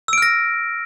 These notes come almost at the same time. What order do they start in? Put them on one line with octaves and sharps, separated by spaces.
E6 D7 F6 A#6